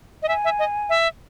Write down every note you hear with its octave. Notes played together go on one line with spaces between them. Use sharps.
D#5
E5 G#5
E5
D#5
E5